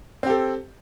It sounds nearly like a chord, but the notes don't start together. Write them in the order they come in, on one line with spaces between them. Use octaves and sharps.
C4 G4 A4